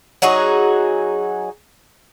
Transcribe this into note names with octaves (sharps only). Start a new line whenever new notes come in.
F#3 D#4 F#4 G#4